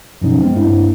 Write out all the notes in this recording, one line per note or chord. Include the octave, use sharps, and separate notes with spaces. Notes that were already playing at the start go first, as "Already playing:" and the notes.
F#2 B2 F3 F#3 C#4 D#4
G#3 B3 C4
G2 A#3 D4 E4